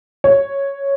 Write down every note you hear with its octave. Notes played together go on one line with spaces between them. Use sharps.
C#5